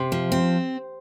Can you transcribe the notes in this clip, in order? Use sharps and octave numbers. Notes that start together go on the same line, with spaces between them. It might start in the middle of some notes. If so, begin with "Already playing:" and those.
Already playing: C3 C5
F3
C4